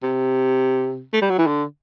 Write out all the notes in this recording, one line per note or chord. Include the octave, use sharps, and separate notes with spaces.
C3
A3
G3
F#3
E3
D3